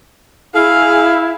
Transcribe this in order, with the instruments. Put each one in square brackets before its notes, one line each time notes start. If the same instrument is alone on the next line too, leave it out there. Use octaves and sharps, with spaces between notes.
[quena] E4 [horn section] G#4 F5